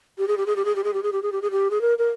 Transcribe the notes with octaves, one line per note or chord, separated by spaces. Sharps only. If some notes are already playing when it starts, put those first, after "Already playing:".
G4
G#4
G4
G#4
G4
G#4
G4
G#4
G4
G#4
G4
G#4
G4
G#4
G4
G#4
A#4
A#4